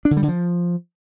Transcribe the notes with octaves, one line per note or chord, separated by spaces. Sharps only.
D4
D3
G3
D3
F3